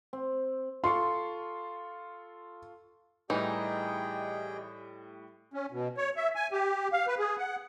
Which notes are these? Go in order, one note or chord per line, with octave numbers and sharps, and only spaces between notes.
C4
F4 A4 C6 C#6
A2 E3 G3 D#4 G4 G#4 D#5 G5
C#4
B2
C#5
E5
G#5
G4
F5
B4
G#4
F#5